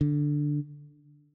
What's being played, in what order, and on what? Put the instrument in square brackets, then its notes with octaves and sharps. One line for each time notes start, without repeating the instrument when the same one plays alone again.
[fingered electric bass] D3